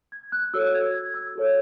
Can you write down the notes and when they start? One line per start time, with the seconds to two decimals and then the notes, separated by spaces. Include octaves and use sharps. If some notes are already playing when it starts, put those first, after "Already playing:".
0.12 G#6
0.32 F#6
0.54 F#4 A4 C#5 E6
0.74 G#6
0.94 G#6
1.14 E6
1.35 F#4 A4 C#5